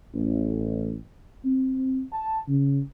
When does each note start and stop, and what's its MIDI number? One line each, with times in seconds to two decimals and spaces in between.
0.14 0.94 33
1.45 2.00 60
2.12 2.37 81
2.48 2.80 49